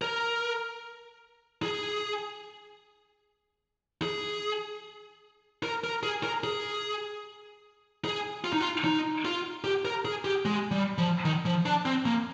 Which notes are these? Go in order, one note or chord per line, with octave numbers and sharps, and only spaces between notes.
A#4
G#4
G#4
A#4
A#4
G#4
A#4
G#4
G#4
F4
D#4
F4
D#4
F4
G4
A#4
G#4
G4
G#3
G3
F3
D#3
F3
D4
C4
A#3